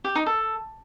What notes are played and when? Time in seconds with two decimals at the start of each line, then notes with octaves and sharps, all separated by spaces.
0.04 G4
0.15 D#4
0.26 A4